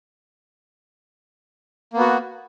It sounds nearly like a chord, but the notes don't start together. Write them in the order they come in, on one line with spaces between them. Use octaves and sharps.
A#3 B3 F#4